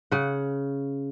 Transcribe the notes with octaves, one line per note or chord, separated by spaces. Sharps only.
C#3 F#5